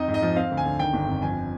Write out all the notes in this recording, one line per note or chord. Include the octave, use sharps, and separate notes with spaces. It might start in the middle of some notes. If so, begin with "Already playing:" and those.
Already playing: F2 D#4 D#5
G#2
D#5
F3
C4 F5
D2
G#5
D3
D#3 G5
G1
F2
F3 G#5